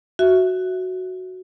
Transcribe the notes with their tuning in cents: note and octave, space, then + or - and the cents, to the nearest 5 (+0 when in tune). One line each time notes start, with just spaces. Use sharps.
F#4 +0 E5 +0